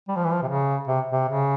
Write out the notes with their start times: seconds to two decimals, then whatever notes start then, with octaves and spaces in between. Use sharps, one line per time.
0.08 G3
0.16 F3
0.24 E3
0.31 F3
0.42 C3
0.48 C#3
0.88 C3
1.12 C3
1.28 C#3